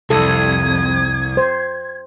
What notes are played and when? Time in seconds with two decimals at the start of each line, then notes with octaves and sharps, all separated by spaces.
0.10 C2 F2 A4 D#6 G#6
1.37 C5